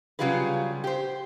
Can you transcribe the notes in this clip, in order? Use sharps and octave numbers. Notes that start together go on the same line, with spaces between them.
C#3 F#3 G3 F4 G#4 B4
G4 C5